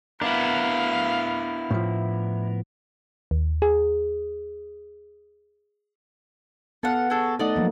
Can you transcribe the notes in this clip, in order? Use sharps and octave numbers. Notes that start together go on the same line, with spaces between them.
B3 D4 E4 A#4 F5
A2 F3
D#2
G#4
B3 A4 F5 F#5
F#4 G#4 A4
A3 D#4 A4 D5 D#5 F#5
F3 F#3 A#3